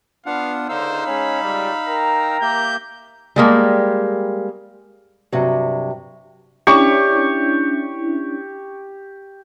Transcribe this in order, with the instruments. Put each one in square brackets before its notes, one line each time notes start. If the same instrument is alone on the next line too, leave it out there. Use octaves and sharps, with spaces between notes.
[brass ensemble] B3 [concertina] D4 F4 F#5 [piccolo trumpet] F5
[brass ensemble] C#2 D3 [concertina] D#4 F5 E6 [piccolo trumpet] C5
[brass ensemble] G#3 C#4 [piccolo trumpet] B5
[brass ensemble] C#2 G3
A#4 G5 A#5
[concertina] A#3 G4 E5 [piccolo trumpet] G6
[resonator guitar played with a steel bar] G3 G#3 A#3
[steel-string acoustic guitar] G2 C3 F#3
[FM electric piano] C#4 D4 E4 [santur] G4 C#6